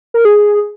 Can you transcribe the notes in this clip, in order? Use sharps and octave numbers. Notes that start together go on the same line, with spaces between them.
A#4
G#4